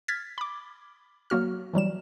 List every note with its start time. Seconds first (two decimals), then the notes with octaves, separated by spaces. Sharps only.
0.08 F6 G#6 A6 B6
0.38 B5 D6
1.30 F#3 A#3 F#4 F6
1.73 E3 F#3 G3 E7